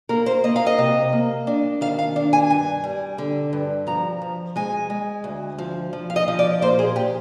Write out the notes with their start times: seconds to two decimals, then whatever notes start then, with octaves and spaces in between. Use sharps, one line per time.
0.09 A#3 A#4
0.26 C5
0.44 A#3 D#5
0.56 F5
0.66 D#5
0.78 C3
1.13 A#3
1.47 D4
1.81 D#3 F5
1.99 F5
2.16 D4
2.33 G#5
2.50 G2 G#5
2.84 G3
3.18 D3
3.53 G2
3.87 F3 A#5
4.22 F3
4.56 G#3 G#5
4.90 G#3
5.24 D2
5.59 F3
5.93 F3
6.10 F5
6.16 D#5
6.28 F3
6.39 D5
6.62 A#2 C5
6.79 G#4
6.96 A#2 G4